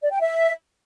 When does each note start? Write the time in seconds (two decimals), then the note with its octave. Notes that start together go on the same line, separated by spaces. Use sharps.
0.02 D5
0.11 G5
0.20 E5